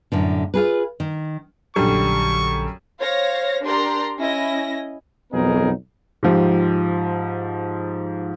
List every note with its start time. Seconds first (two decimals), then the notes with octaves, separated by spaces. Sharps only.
0.12 F#2 A2 D3
0.54 F4 G#4 B4
1.00 D#3
1.76 A#1 F#2 D3 G3 A4 C#6
2.99 C5 C#5 F5 A#6
3.63 D4 G4 A#4 D5 A#5 C6
4.20 C#4 E4 D#5 A#6
5.33 B1 F2 B3 D#4 G#4 A#4
6.23 G#2 F3 G4